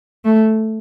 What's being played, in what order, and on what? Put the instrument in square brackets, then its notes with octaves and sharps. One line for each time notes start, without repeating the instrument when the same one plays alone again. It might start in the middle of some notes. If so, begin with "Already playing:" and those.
[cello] A3